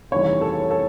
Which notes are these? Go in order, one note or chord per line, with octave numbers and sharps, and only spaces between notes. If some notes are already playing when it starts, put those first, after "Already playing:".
F1 D#2 C#3 E3 G3 C#5
A4
A4